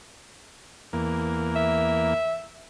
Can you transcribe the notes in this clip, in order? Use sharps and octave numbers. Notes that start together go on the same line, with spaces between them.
E2 A#3
E5